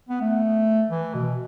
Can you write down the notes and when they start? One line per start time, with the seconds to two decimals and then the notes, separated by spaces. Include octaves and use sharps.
0.09 B3
0.21 A3
0.90 E3
1.14 B2